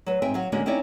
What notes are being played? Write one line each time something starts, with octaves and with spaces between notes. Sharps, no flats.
F#3 B4
G#2 C4 E5 G5 G#5
F#3 F5
D3 G#3 A#3 C#4 D4 F#4
C4 C#4 D#4 E4 C#5 D5